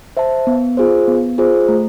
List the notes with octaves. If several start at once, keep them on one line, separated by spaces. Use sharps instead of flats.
C5 E5 A5
B3
F4 G#4 C5
B3
F4 G#4 C5
A3